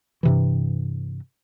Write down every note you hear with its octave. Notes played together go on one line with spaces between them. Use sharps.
G2 C3 E3